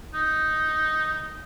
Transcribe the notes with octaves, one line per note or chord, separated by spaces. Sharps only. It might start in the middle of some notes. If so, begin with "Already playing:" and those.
D#4